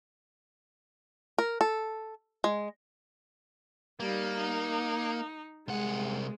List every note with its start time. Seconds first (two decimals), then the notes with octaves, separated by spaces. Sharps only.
1.38 A#4
1.61 A4
2.44 G#3
4.00 G3 A#3 D#4
4.37 D#4
5.68 C2 G#3 F#5